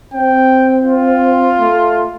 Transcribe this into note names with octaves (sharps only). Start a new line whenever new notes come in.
C4 G5
F4
A3